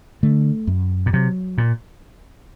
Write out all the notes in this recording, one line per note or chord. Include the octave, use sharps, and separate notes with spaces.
D3 A3
F#2
A#2
C3 F#3
A#2